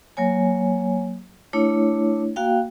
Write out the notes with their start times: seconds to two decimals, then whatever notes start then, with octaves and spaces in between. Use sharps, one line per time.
0.17 F#3 A#3 C#5 G#5
1.53 A3 D4 E4 C#5
2.36 A#3 F#4 F5 G5